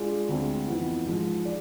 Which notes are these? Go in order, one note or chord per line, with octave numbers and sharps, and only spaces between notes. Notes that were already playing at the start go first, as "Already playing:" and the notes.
Already playing: G#3 D4 F4 G#4 D5
D2 D3 G#3 C4
F2 E3 B3 F4
G#2 F3 G#3
G#4 D5